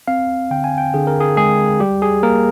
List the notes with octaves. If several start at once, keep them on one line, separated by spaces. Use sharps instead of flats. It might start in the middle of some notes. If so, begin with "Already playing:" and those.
C4 F5
D3 G5
G#5
G5
D3 G#4
A#4
G#4
G#3 G#4
G3 G4
G#4
A#3 A#4